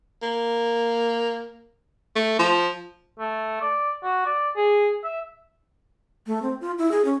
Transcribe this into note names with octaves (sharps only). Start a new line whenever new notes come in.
A#3
A3
F3
A3
D5
F#4
D5
G#4
E5
A3
C4
F4
E4
G#4
C#4